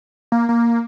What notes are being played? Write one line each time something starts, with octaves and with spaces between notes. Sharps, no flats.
A#3
A#3